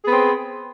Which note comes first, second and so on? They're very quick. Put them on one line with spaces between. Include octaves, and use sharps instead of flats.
G#4 B3 C4